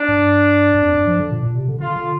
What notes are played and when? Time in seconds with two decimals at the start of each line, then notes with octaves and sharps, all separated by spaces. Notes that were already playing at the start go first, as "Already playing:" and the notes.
Already playing: D4
0.09 G2
0.75 G2
0.82 F2
0.95 G2
1.07 F3
1.19 D3
1.31 A#2
1.43 A#2
1.55 C3
1.68 D3
1.80 D3 F4
1.96 D3